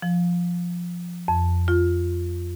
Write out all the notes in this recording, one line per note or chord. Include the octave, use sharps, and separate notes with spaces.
F3
F2
F4